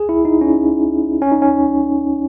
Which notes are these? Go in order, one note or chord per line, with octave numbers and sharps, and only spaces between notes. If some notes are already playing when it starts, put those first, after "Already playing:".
Already playing: G#4
E4
D#4
C#4
C#4
D#4
C#4